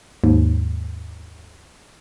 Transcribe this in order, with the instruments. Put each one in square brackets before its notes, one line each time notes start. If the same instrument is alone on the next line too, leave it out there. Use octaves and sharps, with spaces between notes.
[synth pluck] D#2 G#2